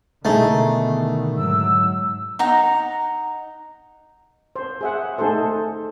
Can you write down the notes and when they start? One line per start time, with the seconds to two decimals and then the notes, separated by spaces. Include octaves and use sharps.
0.25 B2 D3 D#3 A3 D#4 E4 G#4
1.35 G#2 F#3 E6
2.39 D#4 F#5 A#5
4.56 C5
4.81 G#4 E5 F#5
5.18 A3 D#4 G#4 A4 C5